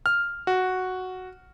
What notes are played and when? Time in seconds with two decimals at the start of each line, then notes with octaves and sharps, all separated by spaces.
0.06 F6
0.47 F#4